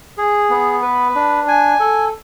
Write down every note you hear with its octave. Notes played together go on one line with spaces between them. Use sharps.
G#4
B3
B4
D4
G#5
A4